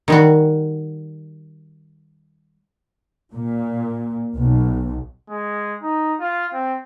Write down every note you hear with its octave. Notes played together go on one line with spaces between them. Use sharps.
D#3 G3 F#4
A#2
B1
G#3
D#4
F4
C4